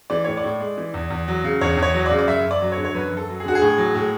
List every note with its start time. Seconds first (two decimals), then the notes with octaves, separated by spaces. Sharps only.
0.10 E3 D5
0.24 A2 C#5
0.37 D5
0.44 A2
0.60 G#3
0.78 E3
0.94 E2
1.10 E2
1.28 F#3
1.44 C#3
1.61 E2 C#5
1.77 E2
1.83 C#5
1.94 F#3
2.06 D5
2.11 C#3
2.19 D5
2.27 F#2 E5
2.45 F#2
2.51 D5
2.62 F#3
2.72 C#5
2.77 D3
2.85 C#5
2.95 F#2 B4
3.12 F#2
3.17 A4
3.29 F#3
3.40 G#4
3.46 D3 F#4
3.55 G#4
3.62 A2
3.78 F#3
3.95 A2